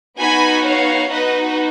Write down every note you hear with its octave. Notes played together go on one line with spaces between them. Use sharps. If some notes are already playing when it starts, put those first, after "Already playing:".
B3 D#4 F#4 G#5 B5
C#5 F5
B3 D#4 F#4 B4 D#5